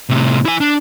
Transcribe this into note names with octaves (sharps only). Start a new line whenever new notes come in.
A2 C3
E4 G#5
D4